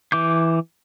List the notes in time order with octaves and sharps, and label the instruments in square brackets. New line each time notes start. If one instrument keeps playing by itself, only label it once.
[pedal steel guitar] E3 D6 G6